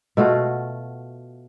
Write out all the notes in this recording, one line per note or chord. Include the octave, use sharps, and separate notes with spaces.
B2 A3 F4 F#4